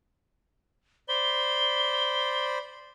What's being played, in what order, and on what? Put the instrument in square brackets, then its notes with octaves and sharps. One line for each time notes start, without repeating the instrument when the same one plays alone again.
[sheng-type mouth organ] C5 D5 B5 [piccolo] G7